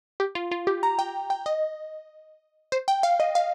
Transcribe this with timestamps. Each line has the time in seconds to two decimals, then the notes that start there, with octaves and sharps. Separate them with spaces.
0.20 G4
0.35 F4
0.51 F4
0.67 G4
0.83 A#5
0.99 G5
1.30 G5
1.46 D#5
2.72 C5
2.88 G5
3.03 F5
3.20 D#5
3.35 F5